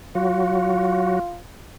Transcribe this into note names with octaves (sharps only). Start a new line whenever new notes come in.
F#3 F4 F#4